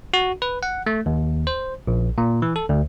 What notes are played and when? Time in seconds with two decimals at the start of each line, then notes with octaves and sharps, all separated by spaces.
0.14 F#4
0.42 B4
0.63 F#5
0.86 A3
1.06 D#2
1.47 C5
1.87 A#1
2.18 A#2
2.42 E3
2.56 A4
2.69 D2